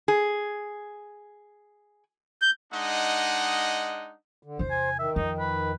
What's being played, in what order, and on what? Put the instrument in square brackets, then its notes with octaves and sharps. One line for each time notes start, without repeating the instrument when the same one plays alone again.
[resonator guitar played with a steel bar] G#4
[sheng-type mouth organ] G6
[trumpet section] G#3 D4 D#4 D#5 F#5
[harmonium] D3
[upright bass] E2 C3 [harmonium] C5
[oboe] G#5
[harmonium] D#3 [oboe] E5
[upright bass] F2 [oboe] D#4
[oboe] B4